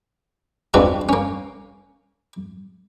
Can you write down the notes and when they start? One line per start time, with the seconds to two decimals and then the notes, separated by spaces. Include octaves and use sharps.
0.74 G#3 B3 C4 D4 F4 F#4
1.09 A#3 C#4